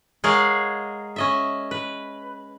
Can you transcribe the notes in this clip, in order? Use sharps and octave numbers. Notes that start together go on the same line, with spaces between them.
G#3 G#4 A#4 C#5 F5 F#5
C#4 D#5 E5
B4